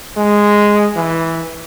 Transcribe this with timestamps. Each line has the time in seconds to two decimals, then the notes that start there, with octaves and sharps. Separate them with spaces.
0.17 G#3
0.96 E3